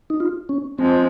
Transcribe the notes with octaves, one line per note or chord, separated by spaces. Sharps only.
D#4
F4
C#4
F3 G#3 C4